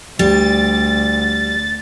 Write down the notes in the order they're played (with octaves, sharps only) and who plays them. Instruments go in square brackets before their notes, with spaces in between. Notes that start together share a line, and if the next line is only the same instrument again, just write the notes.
[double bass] D2 [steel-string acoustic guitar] G3 [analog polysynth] A6